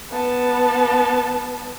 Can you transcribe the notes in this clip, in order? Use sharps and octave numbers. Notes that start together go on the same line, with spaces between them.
B3 A5